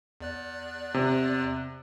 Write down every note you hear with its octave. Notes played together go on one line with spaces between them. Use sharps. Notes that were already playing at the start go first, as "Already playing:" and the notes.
E2 D5 F#6
C3